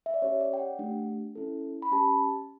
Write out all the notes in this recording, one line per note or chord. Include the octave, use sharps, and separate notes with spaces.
E5
D5
C#4 G4 C#5
D5
G5
F#5
A3 D4 G4
C#4 E4 A4
B5
C#4 G4 A5